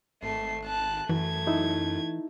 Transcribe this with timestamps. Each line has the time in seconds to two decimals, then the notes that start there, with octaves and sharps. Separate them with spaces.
0.22 G#1 A3 C7
0.65 A5 F#6
1.09 F#2 E3 A3 G#6
1.47 D#4 E4